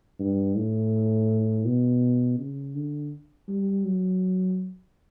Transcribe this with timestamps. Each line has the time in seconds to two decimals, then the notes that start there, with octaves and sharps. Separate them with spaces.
0.20 G2
0.56 A2
1.65 B2
2.39 C#3
2.75 D3
3.49 G3
3.85 F#3